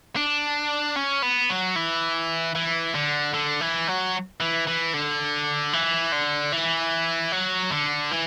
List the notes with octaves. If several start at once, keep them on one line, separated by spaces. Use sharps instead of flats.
D4
C#4
B3
F#3
E3
E3
D3
D3
E3
F#3
E3
E3
D3
E3
D3
E3
F#3
D3
E3